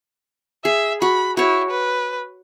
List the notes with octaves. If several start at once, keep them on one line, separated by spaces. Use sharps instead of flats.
G#4 E5
F#4 B5
E4 F#4 C#5
B4